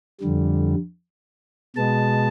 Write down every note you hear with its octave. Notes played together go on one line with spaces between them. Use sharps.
F2 D3 G3
B2 G#3 B3 A5